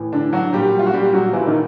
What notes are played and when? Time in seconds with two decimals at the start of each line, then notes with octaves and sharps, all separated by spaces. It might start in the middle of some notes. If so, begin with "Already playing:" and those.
Already playing: A2 E3
0.13 D3 D4
0.33 F#3 F#4
0.52 A#2 F#3 G3 G4
0.79 F4
0.86 F#4
0.93 G3 G4
1.13 F#3 F#4
1.33 A#2 E3 F3 E4
1.47 D#3 D#4